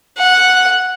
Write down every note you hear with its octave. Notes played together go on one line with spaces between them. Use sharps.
F#5